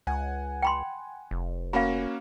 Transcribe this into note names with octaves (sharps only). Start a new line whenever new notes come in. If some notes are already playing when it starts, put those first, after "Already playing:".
C#2 F#5 G#5
G5 B5 C6
F1
A#3 C#4 F#4 F5 B5